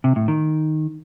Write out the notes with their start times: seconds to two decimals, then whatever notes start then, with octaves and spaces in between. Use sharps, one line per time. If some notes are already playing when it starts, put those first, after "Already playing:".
0.04 C3
0.16 A2
0.28 D#3